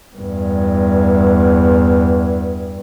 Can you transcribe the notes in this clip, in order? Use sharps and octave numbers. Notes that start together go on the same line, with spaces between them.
E2 G2